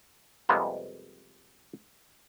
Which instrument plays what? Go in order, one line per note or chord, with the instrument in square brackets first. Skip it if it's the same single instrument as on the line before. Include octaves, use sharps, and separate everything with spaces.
[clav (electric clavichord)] F2 C3 G3 G#3 A#3 B3